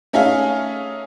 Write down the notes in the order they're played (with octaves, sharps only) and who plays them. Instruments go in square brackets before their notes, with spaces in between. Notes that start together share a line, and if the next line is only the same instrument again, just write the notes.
[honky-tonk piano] A3 C#4 D#4 G#4 E5 F5